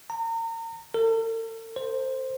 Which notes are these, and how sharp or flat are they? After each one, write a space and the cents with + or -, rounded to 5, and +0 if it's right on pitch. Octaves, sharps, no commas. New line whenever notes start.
A#5 -35
A4 +45
C5 +5